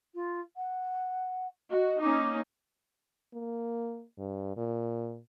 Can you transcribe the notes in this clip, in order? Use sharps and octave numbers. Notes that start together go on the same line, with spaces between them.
F4
F#5
F#4 D#5
A#3 C#4 D#4 D6
A#3
G2
A#2